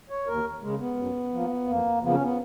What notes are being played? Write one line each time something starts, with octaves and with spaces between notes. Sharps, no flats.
C#5
D#2 A#4
C#3 G#3
B3
F#2
F3 A#3
F2 A#3
C#3 F3 A#3 B3
C#4
B3